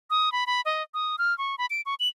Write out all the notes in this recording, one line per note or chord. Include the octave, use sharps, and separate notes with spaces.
D#6
B5
B5
D#5
D#6
F6
C#6
B5
D7
C#6
F#7